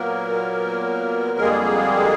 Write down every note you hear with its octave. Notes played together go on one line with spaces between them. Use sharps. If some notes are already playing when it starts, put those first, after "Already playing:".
Already playing: A#2 F#3 A#3 B3 A#4
F2 D3 G3 G#3 A#3 G#4